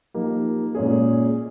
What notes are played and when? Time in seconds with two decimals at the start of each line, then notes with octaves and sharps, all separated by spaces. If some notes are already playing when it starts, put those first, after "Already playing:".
0.14 F3 A#3 D#4 G4
0.75 A#2 G#3 C#4 G#4